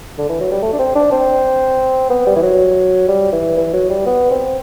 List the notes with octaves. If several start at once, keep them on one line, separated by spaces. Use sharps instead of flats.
D3
E3
F#3
G3
A3
D4
C4
D4
C4
B3
G3
E3
F#3
G3
E3
E3
F#3
G3
B3
C4